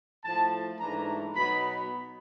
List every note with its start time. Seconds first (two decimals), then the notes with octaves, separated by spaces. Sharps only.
0.24 A2 F3 A3 A5
0.80 G#2 E3 A3 D4 A#5
1.36 B2 F#3 B3 D#4 B5